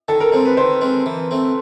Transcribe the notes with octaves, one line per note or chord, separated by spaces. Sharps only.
D#3 A4
A#4
G#3 C4
B4
D#3 C5
G#3 C4
E3
A3 C4